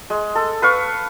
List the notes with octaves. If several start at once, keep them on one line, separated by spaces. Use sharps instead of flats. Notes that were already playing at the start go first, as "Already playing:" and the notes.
G#3
A4
B4 F5 C#6